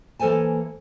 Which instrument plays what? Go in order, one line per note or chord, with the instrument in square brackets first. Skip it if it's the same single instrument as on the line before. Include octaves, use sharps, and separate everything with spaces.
[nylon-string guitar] E3 A#3 A4 C5 G#5 A5